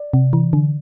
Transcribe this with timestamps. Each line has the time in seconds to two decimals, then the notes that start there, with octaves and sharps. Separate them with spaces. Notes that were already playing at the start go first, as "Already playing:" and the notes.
Already playing: D5
0.13 C3
0.33 E3
0.53 D3